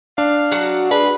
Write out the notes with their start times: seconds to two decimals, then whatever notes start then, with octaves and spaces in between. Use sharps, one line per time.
0.18 D4 F5
0.51 F#3 F#4 F#5
0.91 G#3 D4 B4